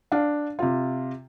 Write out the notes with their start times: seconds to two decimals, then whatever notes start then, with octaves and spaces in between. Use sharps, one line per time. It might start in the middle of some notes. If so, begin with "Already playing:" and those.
0.12 D4 F5
0.59 C3 F4